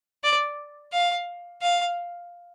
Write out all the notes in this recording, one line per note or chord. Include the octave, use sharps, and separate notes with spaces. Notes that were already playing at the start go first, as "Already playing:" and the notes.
D5
F5
F5